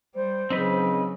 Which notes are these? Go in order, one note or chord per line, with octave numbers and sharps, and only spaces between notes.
G3 C5
C#3 F#3 C4 D#4 B4